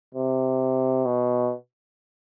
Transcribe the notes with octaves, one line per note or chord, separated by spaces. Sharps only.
C3
B2